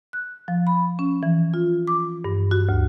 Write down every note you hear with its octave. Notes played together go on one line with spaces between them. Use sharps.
F#6
F3
B5
C#4
E3
F4
D6
G2
F#4
D2